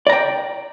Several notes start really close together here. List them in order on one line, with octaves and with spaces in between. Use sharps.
D5 A#5 G5